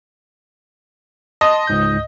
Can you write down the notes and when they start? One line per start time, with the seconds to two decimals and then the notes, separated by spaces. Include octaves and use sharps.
1.41 D#5 A5 C6 D#6
1.67 C#2 G#2 G6